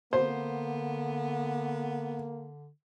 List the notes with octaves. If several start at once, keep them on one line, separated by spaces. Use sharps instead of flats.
D3 A#3 B3 C5